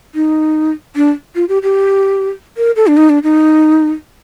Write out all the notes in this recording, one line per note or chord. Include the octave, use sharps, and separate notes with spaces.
D#4
D4
F4
G4
G4
A#4
A4
D4
D#4
D4
D#4